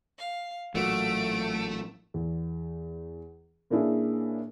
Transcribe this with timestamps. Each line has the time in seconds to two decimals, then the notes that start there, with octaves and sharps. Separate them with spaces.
0.18 F5
0.75 A1 A#2 F#3 A3 F#4 D7
2.14 E2
3.70 A#2 A#3 C#4 D4 E4 G#4